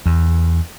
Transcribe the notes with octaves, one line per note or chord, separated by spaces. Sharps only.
E2